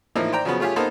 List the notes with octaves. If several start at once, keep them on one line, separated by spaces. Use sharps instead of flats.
A2 E3 F3 A#3 D#4 E4
C5 D5 G5 A#5
C#3 F3 F#3 B3
A3 C#4 F4 G4 G#4
A#3 B3 D#4 A4 C5